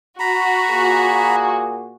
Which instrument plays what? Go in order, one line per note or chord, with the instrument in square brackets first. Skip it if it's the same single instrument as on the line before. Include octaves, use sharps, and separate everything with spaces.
[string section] F#4 [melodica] A#5 B5
[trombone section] A#2 A#3 G#4